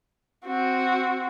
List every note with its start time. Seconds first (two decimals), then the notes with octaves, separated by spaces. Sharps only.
0.46 C4 F#4